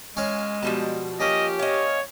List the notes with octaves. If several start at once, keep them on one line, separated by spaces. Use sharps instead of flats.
G#3 C#4 C#5 F5
B2 F3 G3 A5
A#3 C#4 G4 D#5
C#5 D#5 F5